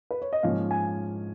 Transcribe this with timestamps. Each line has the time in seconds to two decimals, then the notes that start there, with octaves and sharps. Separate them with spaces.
0.11 B4
0.22 C#5
0.33 D#5
0.43 G#2 F3 A#3 C#4 F5
0.71 G#5